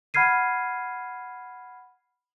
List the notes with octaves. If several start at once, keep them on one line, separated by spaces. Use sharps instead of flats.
F#5 B5 F6 G#6 C7 D#7